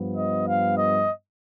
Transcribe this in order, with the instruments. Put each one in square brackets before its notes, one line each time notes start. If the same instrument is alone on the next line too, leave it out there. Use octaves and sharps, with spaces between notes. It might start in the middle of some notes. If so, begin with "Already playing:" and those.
Already playing: [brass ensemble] G2 F3 B3
D#5
F5
D#5